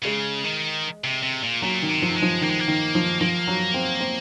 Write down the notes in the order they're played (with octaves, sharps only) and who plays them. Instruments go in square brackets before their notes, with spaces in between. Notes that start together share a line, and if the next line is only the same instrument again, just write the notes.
[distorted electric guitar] C#3 [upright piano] G#3
[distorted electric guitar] D#3
C3
C3
A#2
[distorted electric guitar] A#2 [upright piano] F#3
[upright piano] D#3
[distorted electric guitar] C3
[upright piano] F3
[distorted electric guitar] G#3
[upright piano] F3
[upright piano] D#3 [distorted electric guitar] A#3
[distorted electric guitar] G#3
A#3
[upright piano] D#3
F3
[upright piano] F3 [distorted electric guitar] A#3
[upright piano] F#3
C4
C4